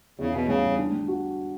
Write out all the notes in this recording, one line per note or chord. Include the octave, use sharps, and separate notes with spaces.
E2 C#3
B2 B3
C#3 G3
G3
D4
G3
F#4